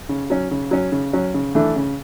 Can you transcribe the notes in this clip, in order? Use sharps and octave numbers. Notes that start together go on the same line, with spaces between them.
C#3
F#3 C#4
C#3
F#3 C#4
C#3
F#3 C#4
C#3
E3 A3 D4
C#3